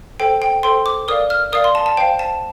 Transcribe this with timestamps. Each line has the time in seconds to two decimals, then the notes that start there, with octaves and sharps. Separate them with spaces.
0.20 A4 C5 G5
0.42 G5
0.63 A4 C5 G5 C6
0.86 D6
1.08 A#4 D5 F5 D#6
1.30 F6
1.53 A#4 D5 F5 D#6
1.64 C6
1.75 A5
1.86 A5
1.97 C5 F5 G5
2.19 A5